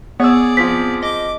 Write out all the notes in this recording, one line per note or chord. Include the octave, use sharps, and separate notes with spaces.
B3 G#4 C#5 D5 E6
F3 C4 B6
D#5 D6